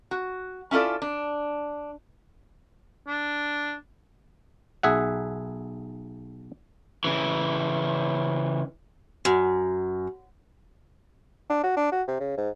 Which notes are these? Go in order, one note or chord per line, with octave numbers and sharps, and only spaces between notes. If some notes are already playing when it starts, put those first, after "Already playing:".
F#4
C#4 E4 F4 A4 D5
D4
D4
B1 G#4 E5 F#5
C#3 E3
F#2
D4
F#4
D4
F#4
C3
C#3
G#2